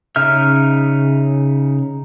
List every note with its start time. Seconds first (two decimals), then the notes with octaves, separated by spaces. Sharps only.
0.16 C#3 D#4 E5 F6